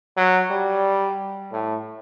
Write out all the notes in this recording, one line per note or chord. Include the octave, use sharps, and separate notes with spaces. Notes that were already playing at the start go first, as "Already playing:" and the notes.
F#3
G3
A2